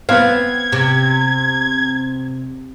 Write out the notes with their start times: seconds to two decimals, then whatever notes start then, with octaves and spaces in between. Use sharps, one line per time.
0.09 B3 C4 F5 G#6
0.72 C3